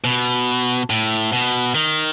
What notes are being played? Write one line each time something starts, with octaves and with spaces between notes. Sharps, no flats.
B2
A2
B2
D#3